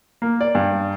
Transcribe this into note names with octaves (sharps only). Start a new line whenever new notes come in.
A#3
D5
G2